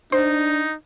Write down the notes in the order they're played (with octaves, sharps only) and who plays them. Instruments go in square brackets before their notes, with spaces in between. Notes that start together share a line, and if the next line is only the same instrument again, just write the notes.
[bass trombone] D4 [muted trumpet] D#4 [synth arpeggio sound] C5